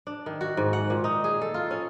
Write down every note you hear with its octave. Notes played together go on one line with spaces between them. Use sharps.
D4
D#3
F#4
G#2
F#5
A#2
D#4
G#4
A4
F4
C#4